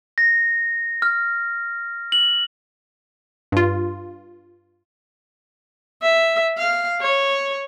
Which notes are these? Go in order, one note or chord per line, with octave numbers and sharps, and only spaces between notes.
A#6
F6
F#7
G2 F4
E5
F5
C#5